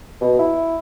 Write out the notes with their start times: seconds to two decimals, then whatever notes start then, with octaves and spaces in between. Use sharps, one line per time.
0.21 B2
0.39 E4